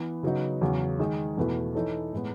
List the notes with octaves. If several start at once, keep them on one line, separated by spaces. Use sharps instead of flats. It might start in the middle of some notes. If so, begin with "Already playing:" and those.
Already playing: E3 B3
C#3 F#3 B3 D#4
E2 C#3 F#3
D#3 G#3 D#4 G#4
E2 B2 A3 E4 B4
E3 A3 D#4 A4 C#5
A2 G#3 B3